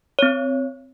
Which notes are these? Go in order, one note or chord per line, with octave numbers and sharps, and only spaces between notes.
C4 C#5